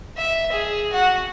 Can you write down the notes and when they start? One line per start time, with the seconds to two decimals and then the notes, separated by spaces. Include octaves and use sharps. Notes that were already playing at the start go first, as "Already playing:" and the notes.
0.17 E5
0.52 G#4
0.93 F#4 F#5